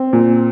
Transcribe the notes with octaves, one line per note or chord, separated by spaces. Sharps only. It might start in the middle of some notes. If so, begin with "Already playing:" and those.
Already playing: C4
A#2